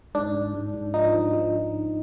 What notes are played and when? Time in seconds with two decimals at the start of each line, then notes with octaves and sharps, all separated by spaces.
0.15 G#2 D4
0.34 G#2
0.54 G#2
0.74 G#2
0.94 F3 D#4
1.14 F3
1.33 F3